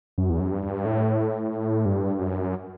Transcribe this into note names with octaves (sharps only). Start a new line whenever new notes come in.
F#2
E2
F#2
G2
A2
G2
F#2